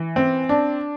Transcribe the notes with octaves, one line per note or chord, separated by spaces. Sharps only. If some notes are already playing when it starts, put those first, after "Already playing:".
Already playing: E3
C4
D4